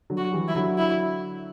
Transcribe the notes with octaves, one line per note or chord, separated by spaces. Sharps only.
D3 F#3
F#4
E3 G3
E4
D3 F#3
E4